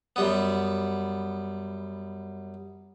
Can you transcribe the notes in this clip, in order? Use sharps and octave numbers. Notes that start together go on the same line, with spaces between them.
F#2 G3 B3